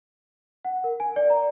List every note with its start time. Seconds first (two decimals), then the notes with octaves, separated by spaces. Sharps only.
0.65 F#5
0.84 A#4
1.00 G#5
1.16 D5
1.30 A#5